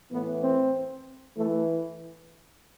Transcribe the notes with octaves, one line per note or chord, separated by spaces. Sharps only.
A2 E3 B3
C4
E3 A3